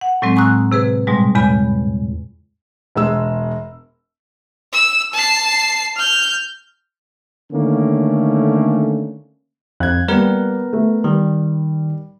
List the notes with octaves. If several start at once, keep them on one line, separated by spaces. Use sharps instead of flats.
F#5
A2 F#3 G#3 C4
G#5 A#5 C#6 D#6 E6 F#6
C3 G#4 B4
G#2 B2 G3 G#3
E2 C#3 G#3 G#5 B5
E1 G#3 E6
E6
A5 C7
F6 G6
D3 D#3 A3 A#3 C#4
F2 F#6 G#6
G3 A#3 B3 A#4 B4
A3
D#3 G3